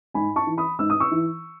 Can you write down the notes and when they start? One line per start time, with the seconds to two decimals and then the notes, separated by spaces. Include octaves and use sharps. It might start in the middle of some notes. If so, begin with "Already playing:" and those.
0.14 G#2 G#5 B5
0.36 A5 C#6
0.47 E3
0.58 B5 D#6
0.79 G#2 E6
0.90 D#6
1.00 C#6 E6
1.11 E3